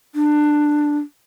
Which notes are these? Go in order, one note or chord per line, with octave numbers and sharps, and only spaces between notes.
D4